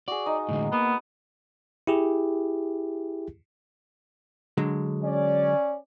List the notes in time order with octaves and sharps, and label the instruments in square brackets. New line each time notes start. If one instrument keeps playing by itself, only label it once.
[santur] F#4 G#4 [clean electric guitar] D5
[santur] D#4 D#5
[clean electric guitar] A2 D3 G#3
[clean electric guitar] A#3 [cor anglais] B3
[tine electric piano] E4 G4 G#4
[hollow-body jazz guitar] D3 F#3 G#3
[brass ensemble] C#4 D5